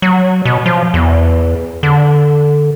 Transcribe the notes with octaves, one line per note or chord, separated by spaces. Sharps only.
F#3
B2
F3
E2
D3